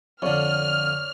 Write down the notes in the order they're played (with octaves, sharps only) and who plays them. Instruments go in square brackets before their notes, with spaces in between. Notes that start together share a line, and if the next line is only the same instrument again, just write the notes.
[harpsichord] F2 D3 [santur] C#5 D5 [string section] F6